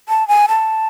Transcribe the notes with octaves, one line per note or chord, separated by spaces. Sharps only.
A5
G#5
A5